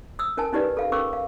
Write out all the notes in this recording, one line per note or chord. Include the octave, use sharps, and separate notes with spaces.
D#6 E6
C#4 A#4 G#5 A5
C#4 D#4 G4 B4 D5
A4 F5
C#4 A#4 C#6 D6 E6
F5